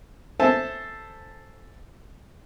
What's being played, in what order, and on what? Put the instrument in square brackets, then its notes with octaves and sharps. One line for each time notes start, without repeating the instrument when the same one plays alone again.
[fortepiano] A4 C5 E5 G#5 A5